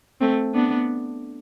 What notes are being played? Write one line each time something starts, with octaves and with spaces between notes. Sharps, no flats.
A3 C4
B3 D4